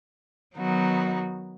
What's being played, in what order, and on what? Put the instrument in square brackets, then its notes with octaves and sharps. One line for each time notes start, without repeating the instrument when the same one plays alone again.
[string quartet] D#3 F#3 B3 D#4 F#4